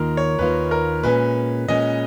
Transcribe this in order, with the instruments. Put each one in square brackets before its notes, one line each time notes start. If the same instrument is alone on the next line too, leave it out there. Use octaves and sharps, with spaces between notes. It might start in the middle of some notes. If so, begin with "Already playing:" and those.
Already playing: [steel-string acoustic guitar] D#2 D#3 A#3 F4 [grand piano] A#4
[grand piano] C#5
[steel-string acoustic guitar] D#2 D#3 A#3 F4 [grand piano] B4
[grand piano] A#4
[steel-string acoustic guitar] A#2 G#3 C#4 [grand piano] B4
[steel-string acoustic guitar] A#2 G#3 C#4 [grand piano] D#5